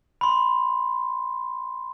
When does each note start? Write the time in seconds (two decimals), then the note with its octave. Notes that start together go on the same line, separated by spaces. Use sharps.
0.21 B5 C6